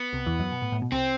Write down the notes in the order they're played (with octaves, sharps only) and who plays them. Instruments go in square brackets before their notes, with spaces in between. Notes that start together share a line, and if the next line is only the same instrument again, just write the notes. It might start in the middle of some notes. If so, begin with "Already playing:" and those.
Already playing: [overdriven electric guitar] B3
[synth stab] C2 C3
E2 E3
F#2 F#3
B2
A2
A2
B2
[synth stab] C2 C3 [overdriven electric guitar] C4